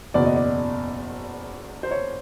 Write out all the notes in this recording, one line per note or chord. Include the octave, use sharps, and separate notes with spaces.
F#1 E2 B2 D5
D#5
D5
C5
C#5